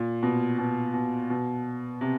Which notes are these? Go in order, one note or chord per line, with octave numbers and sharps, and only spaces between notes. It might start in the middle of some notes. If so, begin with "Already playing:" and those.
Already playing: A#2
B2
B2
B2
B2
C3